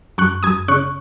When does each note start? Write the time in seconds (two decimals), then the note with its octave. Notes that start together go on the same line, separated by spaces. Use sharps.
0.18 F#2 C#6 F#6
0.43 F#2 D#6 G#6
0.68 C#3 C#6 F#6